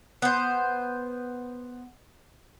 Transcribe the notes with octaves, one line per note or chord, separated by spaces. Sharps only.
B3 C5